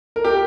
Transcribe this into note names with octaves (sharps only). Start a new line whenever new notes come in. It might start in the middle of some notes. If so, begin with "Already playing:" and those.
A#4
G4